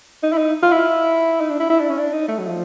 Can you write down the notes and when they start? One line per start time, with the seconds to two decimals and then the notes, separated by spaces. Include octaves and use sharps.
0.23 D#4
0.33 E4
0.38 D#4
0.62 F4
0.71 E4
1.40 D#4
1.50 D4
1.60 E4
1.70 E4
1.80 D4
1.90 C#4
1.98 D4
2.13 D#4
2.28 A3
2.39 F#3
2.48 F3